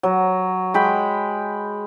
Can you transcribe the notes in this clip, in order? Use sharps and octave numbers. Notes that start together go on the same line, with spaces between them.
F#3
G#3 G5 B5